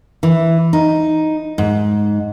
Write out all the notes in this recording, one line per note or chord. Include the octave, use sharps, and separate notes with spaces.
E3
D#4
G#2